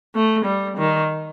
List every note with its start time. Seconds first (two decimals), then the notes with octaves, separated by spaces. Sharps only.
0.15 A3
0.45 G3
0.77 D#3